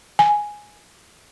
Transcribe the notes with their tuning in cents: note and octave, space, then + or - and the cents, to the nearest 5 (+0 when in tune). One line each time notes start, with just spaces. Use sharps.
G#5 +0